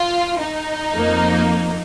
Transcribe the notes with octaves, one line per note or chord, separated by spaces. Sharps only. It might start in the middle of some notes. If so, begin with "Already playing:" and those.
Already playing: F4
D#4
F2 F3 A#3